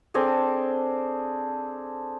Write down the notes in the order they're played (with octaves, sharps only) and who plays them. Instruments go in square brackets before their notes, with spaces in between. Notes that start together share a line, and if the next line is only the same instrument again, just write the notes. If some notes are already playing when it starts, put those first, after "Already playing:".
[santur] C4 D4 G#4 A4